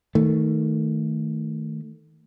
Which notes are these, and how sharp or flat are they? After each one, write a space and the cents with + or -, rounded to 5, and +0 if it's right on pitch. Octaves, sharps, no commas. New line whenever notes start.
D#3 +15 A3 +10